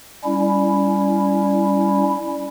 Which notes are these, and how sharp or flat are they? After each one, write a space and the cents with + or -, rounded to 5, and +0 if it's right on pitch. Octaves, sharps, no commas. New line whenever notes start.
G3 +10 C#4 +20 E4 +0